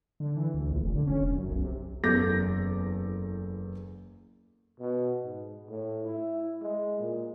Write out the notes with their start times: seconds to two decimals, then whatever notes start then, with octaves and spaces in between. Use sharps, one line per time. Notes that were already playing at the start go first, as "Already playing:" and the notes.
0.20 D3
0.37 E3
0.54 D2
0.71 A#1
0.82 F1
0.96 D3
1.07 C#4
1.20 E1
1.36 F#2
1.49 B1
1.64 C3
2.03 F#1 E2 A4 D6 G6 A#6
4.80 B2
5.23 G#2
5.69 A2
6.05 E4
6.62 G#3
6.99 A#2